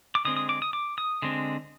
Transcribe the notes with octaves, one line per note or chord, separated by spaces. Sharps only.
D6
D3 G#3 C4 D#6
D#6
D6
D#6
D6
D#6
D3 G#3 C4